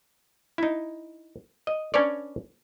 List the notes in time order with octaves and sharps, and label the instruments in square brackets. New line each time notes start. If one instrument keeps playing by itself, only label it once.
[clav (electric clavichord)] D#4 E4
D#5
C#4 D4 B4 C#5 D5